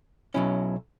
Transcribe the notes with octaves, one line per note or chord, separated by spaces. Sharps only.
B1 B2 F#3 C#4 E4